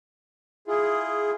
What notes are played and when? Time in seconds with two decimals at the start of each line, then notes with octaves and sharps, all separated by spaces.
0.67 E4 F4 G#4